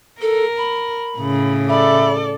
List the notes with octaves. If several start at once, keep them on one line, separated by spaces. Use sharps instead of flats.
A4 A#4
B5
A2 C#3
A4 D5 E5 B5